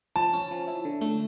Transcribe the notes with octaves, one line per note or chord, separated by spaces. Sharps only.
F3 A5
C#4
F3
E4
D3
A3